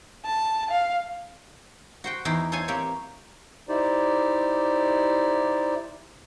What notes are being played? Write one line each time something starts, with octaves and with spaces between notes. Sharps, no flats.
A5
F5
F#4 C5 G5
E2 D#4 E4 G5 C6
A4 C5 C#5 F5 G#5 A5
A#3 C4 G4 C#5
D#4 E4 G4 C5 D5